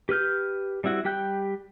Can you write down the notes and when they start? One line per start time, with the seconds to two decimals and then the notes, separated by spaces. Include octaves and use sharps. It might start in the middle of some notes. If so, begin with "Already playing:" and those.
0.09 G4 B4 F6 G6
0.84 G3 C4 E4 F#4
1.05 G3 G4 G5 F#6 G6